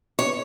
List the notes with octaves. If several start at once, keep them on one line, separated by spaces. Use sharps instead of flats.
C#5